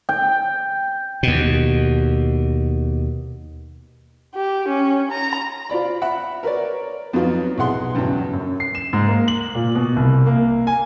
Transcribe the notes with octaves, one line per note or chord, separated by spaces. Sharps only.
G5
D#2 B2
G4
C#4
A#5
F4 C5 D5 B5
E5 F#5 B5
A#4 B4 C#5 D5
F2 F#3 B3 D#4 F4
B1 E4 G#4 F#5 C6
E2 G2 C#3 E3 F#3
F#2
C7
E7
G#2
A#3
F#7
A#2
B2
C2
A#3
G#5